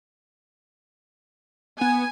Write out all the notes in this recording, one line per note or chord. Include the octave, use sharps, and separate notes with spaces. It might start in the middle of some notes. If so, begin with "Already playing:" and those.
B3 G#5